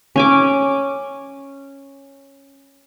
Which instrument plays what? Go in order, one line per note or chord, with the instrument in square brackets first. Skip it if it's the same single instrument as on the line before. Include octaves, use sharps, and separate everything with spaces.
[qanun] C#4 G#5 D6